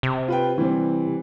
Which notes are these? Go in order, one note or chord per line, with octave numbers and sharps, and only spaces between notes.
C3
F4 B4 G5
E3 G3 C4